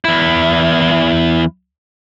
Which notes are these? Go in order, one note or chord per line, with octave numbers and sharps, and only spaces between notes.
E2 E4